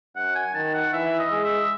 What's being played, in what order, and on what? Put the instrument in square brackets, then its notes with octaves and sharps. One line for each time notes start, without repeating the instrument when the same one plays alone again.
[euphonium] F#2 [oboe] F#5
[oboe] G#5
[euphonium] D#3 [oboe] A5
[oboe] F#5
[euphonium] E3 [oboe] E5
[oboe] D#5
[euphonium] G#3
[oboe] E5